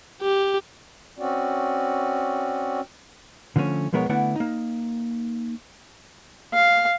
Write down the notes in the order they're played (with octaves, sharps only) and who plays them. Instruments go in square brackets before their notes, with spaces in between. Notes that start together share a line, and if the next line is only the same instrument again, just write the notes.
[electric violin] G4
[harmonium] C4 C#4 F#4 D5
[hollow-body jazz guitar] D3 F3 A3 C4 C#4
B1 F3 G#3 B3 A#4 C#5
D3 A3 B3 E4 D5 F#5
A#3 D#4
[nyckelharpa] F5